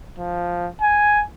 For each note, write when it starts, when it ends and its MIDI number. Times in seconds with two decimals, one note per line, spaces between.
0.19 0.69 53
0.82 1.24 80